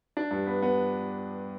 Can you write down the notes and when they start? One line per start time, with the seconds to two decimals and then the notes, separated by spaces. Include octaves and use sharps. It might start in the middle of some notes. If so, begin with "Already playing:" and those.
0.17 D4
0.31 G2
0.46 B3
0.62 B3